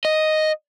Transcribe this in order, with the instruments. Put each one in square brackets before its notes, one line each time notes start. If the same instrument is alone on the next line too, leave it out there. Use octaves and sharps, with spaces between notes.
[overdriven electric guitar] D#5